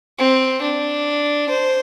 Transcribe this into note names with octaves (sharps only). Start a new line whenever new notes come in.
C4
D4
C5